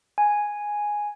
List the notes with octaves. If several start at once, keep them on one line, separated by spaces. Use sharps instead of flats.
G#5